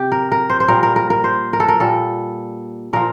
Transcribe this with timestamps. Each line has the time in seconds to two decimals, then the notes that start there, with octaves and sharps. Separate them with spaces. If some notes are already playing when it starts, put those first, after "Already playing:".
Already playing: C3 G4
0.12 A#4
0.32 A#4
0.50 C5
0.60 C5
0.68 A#2 G3 A#4
0.83 A#4
0.96 A#4
1.10 A#4
1.24 C5
1.53 A#4
1.60 A4
1.68 A#4
1.80 A#2 G3 A4
2.93 A#2 F3 A#4